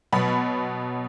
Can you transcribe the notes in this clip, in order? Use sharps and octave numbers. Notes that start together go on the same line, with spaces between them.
B2 F#3 B3 B5